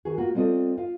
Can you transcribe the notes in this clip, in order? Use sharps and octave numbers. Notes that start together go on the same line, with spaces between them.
D#3 F#4 G#4
A#3 F4 F#4
G3 C4 F4 A4 D#5
F4 F5